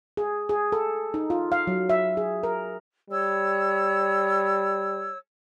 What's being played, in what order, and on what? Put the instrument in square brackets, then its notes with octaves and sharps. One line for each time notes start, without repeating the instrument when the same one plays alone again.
[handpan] G#4
G#4
A4
D#4
F4
F5
F#3
E5
G#4
A#4
[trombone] G3 [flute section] C#5 E6